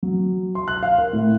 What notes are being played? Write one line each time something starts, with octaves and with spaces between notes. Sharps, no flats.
F#3
C6
F#6
F5
A#4
A2